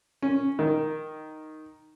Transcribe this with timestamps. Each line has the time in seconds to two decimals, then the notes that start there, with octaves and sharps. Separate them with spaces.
0.22 C#4
0.59 D#3